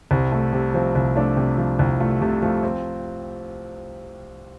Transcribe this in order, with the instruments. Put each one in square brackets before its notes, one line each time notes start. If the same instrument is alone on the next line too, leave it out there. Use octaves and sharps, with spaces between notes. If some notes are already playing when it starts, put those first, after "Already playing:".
[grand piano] C2 C4
A3
C3
F3 C4
C2
A3 D4
C3
F3
C2
A3 F4
C3 A3
F3 A3
C4